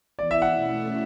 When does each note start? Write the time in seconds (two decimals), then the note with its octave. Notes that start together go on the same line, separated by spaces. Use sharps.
0.19 E3 B3 E4 D5
0.31 E5
0.42 F#5
0.52 B2 A3 C#4 E4 A4